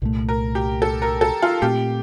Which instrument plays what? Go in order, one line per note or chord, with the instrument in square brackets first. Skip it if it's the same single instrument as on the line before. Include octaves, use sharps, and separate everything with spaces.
[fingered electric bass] C2 A#2 A3
[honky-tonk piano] A#4
G4
A4
A#4
A4
F4
[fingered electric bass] A#2 A3 C4 [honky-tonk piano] G4